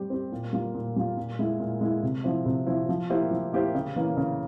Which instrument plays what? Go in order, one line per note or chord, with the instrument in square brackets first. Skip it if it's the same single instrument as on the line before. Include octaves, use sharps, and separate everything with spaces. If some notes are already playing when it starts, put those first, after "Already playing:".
Already playing: [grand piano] G3 C4 G4
C4 G4
A#2
G3 A#3 F4
A#2
G3 A#3 F4
A#2
G#3 E4
A#2
G#3 E4
C3
F3 C4 E4
C3
F3 C4 E4
F3
A#3 E4 G4 C5
F3
A#3 E4 G4 C5
C#3
E3 A#3 C#4
C#3